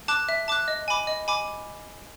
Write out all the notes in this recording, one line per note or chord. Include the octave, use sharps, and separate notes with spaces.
A5 D6 F#6
E5
A5 D6 F#6
D#5
G#5 B5 D6
D#5
G#5 B5 D6